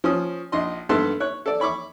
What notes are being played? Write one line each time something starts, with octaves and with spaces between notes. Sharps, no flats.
F3 C#4 D#6
A#1 D#5 C6
G2 B3 A4 B4 A5 C6
C#5 F#6
A4 D5
C#5 B5 C#6 D6